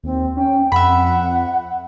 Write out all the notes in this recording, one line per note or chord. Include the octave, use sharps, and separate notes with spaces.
D#2 C4
C#4 G5
F2 E5 F#5 B5